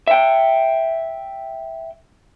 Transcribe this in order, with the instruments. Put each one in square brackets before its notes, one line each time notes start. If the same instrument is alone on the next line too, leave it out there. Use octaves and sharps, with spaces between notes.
[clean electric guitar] E5 G5